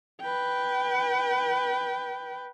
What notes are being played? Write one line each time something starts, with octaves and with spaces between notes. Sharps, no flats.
B4 G5